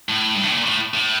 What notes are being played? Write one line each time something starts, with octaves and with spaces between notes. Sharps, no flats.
A2
G2
A2
A#2
A2
A2